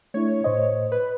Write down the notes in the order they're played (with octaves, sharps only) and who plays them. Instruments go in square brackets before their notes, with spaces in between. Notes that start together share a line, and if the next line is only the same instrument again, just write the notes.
[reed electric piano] A3 D4 E4 [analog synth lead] C#5
[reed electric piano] A2 C5 D#5
[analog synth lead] B4